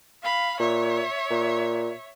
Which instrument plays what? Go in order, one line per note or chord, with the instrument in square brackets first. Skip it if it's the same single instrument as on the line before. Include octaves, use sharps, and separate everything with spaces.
[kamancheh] F5 B5
[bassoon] A#2 [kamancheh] C#5 E5
[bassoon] A#2